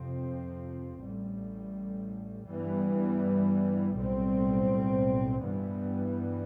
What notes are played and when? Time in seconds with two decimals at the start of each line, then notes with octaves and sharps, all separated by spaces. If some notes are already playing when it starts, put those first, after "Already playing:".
Already playing: F2 C3 F3 C4
1.00 A1 A2 G3
2.48 G2 E3 G3 B3
3.96 B1 A2 G3 C4
5.43 G2 E3 G3 B3